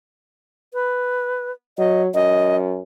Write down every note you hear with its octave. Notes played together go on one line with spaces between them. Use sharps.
B4
F#3 D#5
F#2 D#5